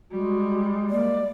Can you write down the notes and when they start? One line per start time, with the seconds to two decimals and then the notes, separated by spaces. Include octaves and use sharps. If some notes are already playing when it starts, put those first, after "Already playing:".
0.11 G3 G#3 F#4
0.90 A#3 D5